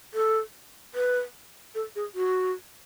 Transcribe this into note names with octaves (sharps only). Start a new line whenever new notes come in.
A4
B4
A4
G#4
F#4